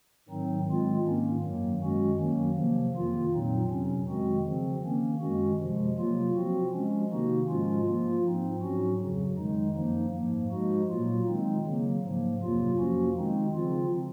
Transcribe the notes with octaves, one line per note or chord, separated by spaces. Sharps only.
G#2 D#3 F#3 C4 D#4
D#3 G#3 C4 F4
G#2 D#3 A#3 C#4
F#2 D#3 F#3 A#3
F#2 D#3 G#3 C#4 F#4
D#3 F#3 A#3 C#4
C3 F3 A#3
F2 D#3 A#3 F4
A#2 F#3 C4 D#4
F2 C3 F#3 C#4
D#3 G#3 C4 F#4
C#3 F3 C4
D#3 A#3 C#4
F#2 D#3 G#3 C#4 F#4
C3 F3 G#3
C3 F#3 A#3 F4
F3 C4 F#4
F3 G#3 C#4
C3 D#3 A#3 D#4 F#4
G#2 F3 G#3 C#4 F4
F3 A#3 F4
G#2 F3 C4 D#4
G#2 F#3 C#4 F#4
F2 C#3 F#3
D#3 G#3 D#4
F#2 F3 A#3 D#4
G#2 F3 A#3
F3 G#3 D#4 F#4
A#2 F#3 A#3 F4
D#3 G#3 C4 D#4
C#3 F#3 A#3
G#2 F3 A#3
F2 C3 F#3 A#3 F4
F3 A#3 C#4 F#4
D#3 G#3 C4 D#4
C#3 F3 C4 F4